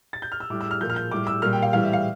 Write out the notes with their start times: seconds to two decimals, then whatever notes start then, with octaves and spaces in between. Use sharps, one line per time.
0.13 A6
0.22 G6
0.32 F6
0.40 E6
0.50 A2 G3 D6
0.61 E6
0.71 F6
0.81 A#2 F3 G6
0.90 F6
0.96 G6
1.11 A2 G3 D6
1.27 E6
1.42 A#2 G3 F6
1.53 G5
1.62 F5
1.73 A2 E3 G3 F5
1.83 E5
1.93 F5